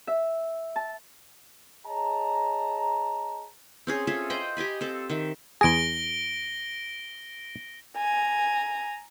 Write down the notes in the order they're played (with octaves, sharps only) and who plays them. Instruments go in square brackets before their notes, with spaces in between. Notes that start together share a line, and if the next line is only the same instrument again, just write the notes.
[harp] E5
A5
[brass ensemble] G#4 C#5 D#5 A5 A#5
[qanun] C4 C#4 G#4
F4 G#4 A4 E5
C5 D#5 G5 B5
G4 D#5 G#5 B5
C4 G4 A4
D#3 E5
[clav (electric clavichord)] E2 G#4 [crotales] A#6 D7 G7
[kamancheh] G#5 A#5